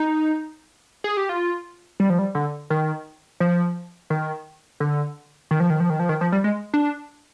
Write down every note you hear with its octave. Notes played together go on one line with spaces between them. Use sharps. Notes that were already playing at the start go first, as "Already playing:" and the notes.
Already playing: D#4
G#4
G4
F4
G3
F3
G3
D3
D#3
F3
D#3
D3
D#3
F3
D#3
F3
D#3
F3
D#3
F3
G3
G#3
D4